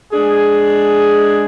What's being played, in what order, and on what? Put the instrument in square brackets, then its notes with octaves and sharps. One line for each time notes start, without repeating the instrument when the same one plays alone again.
[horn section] G#3 D4 G#4